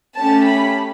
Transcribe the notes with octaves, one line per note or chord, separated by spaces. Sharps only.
A3 C#4 G4 A5
B5